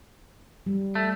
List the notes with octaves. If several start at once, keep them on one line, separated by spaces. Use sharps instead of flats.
G3
A3